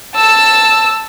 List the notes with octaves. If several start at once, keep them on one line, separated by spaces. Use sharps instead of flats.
A5 E6